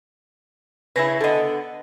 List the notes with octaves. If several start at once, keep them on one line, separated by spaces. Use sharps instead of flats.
C#3 C#4 E4 B4 A#6
D3 B3 A4 D#5